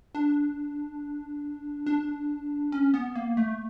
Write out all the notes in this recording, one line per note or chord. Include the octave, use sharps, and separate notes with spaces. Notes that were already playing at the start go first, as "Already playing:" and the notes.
D4
D4
C#4
B3
A#3
A3